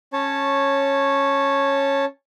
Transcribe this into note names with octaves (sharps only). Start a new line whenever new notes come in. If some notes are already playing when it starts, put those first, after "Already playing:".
C#4 C#5 A5